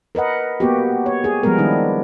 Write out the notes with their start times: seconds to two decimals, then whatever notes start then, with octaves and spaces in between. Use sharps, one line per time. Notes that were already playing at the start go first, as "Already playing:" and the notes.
0.15 A#4 B4 D#5 F#5
0.60 A#3 B3 F#4 G4
1.06 C#5
1.24 G4 G#4
1.43 F3 G3 G#3 B3 A#4
1.58 D#3 G3 D4 E4